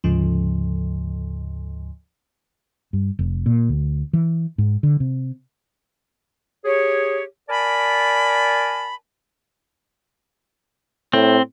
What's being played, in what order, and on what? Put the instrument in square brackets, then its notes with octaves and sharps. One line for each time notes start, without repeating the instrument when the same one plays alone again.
[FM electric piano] D2 G#2 C#3 F3
[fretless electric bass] G2
F1
A#2
D2
E3
G#2
D3
C3
[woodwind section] G4 G#4 C#5
A#4 D5 G#5 A5 B5
[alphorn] A2 [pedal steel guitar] C4